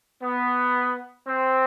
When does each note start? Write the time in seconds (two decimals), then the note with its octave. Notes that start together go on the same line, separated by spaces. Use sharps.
0.23 B3
1.28 C4